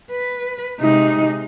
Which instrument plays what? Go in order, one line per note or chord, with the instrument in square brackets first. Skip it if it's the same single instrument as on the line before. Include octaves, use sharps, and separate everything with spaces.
[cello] B4
[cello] C3 G#3 [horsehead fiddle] D#4